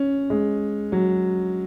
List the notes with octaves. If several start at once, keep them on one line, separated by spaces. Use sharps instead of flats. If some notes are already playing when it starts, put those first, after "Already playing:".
Already playing: C#4
G#3
F#3